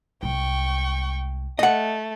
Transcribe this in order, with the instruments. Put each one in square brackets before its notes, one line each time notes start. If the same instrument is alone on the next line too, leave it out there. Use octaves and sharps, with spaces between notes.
[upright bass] C2 G#3 [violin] G5 C#6
[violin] A3 [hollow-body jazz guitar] D#5 F#5